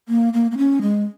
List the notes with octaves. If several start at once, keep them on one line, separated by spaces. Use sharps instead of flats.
A#3
A#3
A#3
C#4
G#3